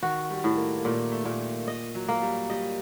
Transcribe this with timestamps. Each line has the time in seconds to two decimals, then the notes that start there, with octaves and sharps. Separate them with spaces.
0.02 D#3 F#4
0.30 G3
0.44 A2
0.57 A#3
0.77 A#3
0.84 A#2 A3
1.12 A3
1.25 A#2
1.68 D#5
1.95 F#3
2.08 A#3
2.22 G3
2.50 G3 D#5